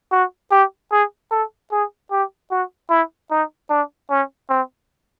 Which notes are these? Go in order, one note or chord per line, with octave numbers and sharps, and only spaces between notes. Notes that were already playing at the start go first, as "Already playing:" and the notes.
F#4
G4
G#4
A4
G#4
G4
F#4
E4
D#4
D4
C#4
C4